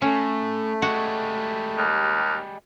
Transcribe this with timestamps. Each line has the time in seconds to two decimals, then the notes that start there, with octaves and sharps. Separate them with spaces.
0.02 A2 A3 C#4
0.82 G3 G#3 F#4
1.78 D#2